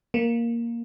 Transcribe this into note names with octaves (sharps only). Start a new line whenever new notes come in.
A#3